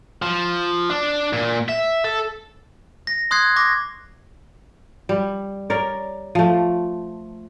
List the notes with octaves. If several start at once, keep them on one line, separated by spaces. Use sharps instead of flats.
F3
D4
A#2
E5
A4
A#6
C6 D#6 F#6 G#6 C7
C#6 D6 G#6 A#6
G3
A#4 C#5 D5
F3 A3